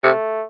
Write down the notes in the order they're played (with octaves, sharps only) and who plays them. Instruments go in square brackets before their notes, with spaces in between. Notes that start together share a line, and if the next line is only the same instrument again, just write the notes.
[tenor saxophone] C3 [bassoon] A3